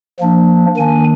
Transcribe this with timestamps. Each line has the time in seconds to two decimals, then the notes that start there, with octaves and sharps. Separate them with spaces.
0.20 F3 A#3 D4
0.77 D#3 A#3 D4 G#5